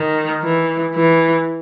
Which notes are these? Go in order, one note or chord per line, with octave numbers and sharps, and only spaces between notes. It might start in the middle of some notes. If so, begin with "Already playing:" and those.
Already playing: D#3
E3
E3